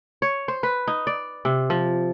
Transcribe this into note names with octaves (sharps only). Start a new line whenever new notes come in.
C#5
C5
B4
D#4
D5
C3
F3